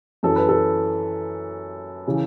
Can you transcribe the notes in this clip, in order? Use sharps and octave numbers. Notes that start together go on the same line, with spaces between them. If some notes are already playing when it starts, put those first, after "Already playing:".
F#2 E3 A4
B4
A4
C#3 E3